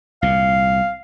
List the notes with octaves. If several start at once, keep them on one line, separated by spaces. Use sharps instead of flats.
C2 A#2 F5